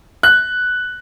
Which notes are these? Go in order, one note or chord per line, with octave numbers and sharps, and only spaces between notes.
F#6